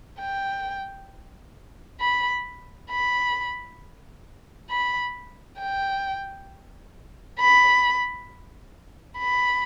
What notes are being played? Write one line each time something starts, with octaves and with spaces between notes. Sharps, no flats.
G5
B5
B5
B5
G5
B5
B5